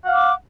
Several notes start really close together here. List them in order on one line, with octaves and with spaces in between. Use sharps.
F#5 F5 D6